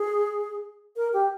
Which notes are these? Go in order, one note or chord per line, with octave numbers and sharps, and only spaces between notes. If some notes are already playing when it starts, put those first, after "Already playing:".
Already playing: G#4
A#4
G4